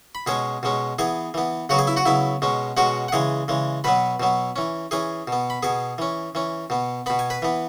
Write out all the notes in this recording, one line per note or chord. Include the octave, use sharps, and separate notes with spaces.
B5
B2 G#3 C#4 G#4 G#5
B2 G#3 C#4
E3 B3 G#4 G#5
E3 B3
C#3 F#3 B3 F#4 F#5
G#4 G#5
E4 E5
F#4 F#5
C#3 F#3 B3 E4 E5
B2 G#3 C#4
B2 G#3 C#4 F#4 F#5
F#5
C#3 E3 G#3 G#4 G#5
C#3 E3 G#3
B2 F#3 B3 B4 B5
B2 F#3 B3
E3 C#4
E3 C#4 G#4 G#5
B2 B3
B5
B2 B3 G#4 G#5
E3 C#4
E3 C#4
B2 B3
B2 B3 B5
G#5
B4 B5
E3 B3